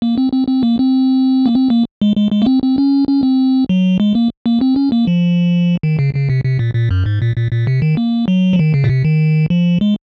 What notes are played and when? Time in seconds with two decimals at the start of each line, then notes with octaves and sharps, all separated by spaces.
0.02 A#3
0.18 C4
0.32 C4
0.48 C4
0.63 A#3
0.79 C4
1.46 A#3
1.55 C4
1.70 A#3
2.01 G#3
2.16 G#3
2.32 G#3
2.42 A#3
2.46 C4
2.63 C4
2.78 C#4
3.08 C#4
3.23 C4
3.69 F#3
4.00 G#3
4.15 A#3
4.46 A#3
4.61 C4
4.76 C#4
4.92 A#3
5.07 F3
5.83 D#3
5.99 C#3
6.15 C#3
6.30 C3
6.44 C3
6.59 A#2
6.75 A#2
6.91 F#2
7.06 G#2
7.22 A#2
7.36 A#2
7.52 A#2
7.67 C3
7.82 D#3
7.97 A#3
8.28 F#3
8.53 F3
8.59 D#3
8.74 C#3
8.84 A#2
8.89 C3
9.05 D#3
9.50 F3
9.81 G#3